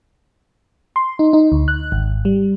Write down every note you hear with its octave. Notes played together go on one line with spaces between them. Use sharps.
C6
D#4
D#4
D2
F#6
G#1
G3